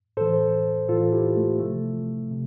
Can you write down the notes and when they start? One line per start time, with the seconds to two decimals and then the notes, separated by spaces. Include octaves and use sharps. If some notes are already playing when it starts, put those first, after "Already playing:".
0.17 A2 E3 A4 C5
0.88 A2 E3 F4 A4
1.13 E4 G4
1.37 A3
1.60 C3 F3 A3
2.31 C3